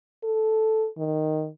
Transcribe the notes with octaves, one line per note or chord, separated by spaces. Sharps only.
A4
D#3